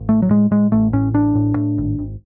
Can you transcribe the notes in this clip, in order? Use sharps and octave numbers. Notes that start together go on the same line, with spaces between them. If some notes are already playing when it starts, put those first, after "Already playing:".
Already playing: A1
A2 A3
F#3
A2 G#3
A2 G#3
A1 A3
A2 C#4
A1 D4
A2
A2
G#1
G#1